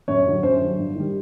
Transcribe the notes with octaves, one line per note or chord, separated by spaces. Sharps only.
F#2 C#5
D3 F#3
F#2 C5
D3 F#3
G2
D#3 G3